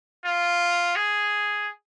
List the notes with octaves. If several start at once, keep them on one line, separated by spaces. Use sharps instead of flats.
F4
G#4